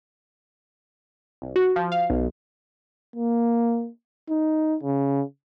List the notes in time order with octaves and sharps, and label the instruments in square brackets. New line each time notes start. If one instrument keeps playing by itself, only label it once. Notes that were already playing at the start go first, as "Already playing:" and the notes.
[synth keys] C2
F#4
F3
F5
B1
[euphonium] A#3
D#4
C#3